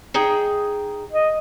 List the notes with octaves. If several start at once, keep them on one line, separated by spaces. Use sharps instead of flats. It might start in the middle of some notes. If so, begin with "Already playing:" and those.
D#4 G#4 G5
D#5